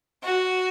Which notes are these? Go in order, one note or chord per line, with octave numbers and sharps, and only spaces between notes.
F#4